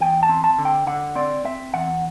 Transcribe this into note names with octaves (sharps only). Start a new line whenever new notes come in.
E2 G5
A5
C4
A5
D3
G5
D3 F#5
C4 D5
C4 E5
E2 F#5